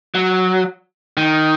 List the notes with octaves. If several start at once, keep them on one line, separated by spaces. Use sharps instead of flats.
F#3
D#3